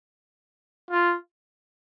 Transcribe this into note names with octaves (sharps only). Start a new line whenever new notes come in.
F4